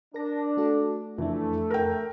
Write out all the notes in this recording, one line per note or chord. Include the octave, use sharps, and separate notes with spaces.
D4 A#4 A#6
A3 F#4 A4
F2 E3 A3 D4
A#4 G5